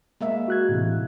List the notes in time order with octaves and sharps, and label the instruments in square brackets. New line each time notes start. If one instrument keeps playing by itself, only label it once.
[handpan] G#3 A#3 E5
[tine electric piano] F#4 F#6 G#6
A2 C3 E3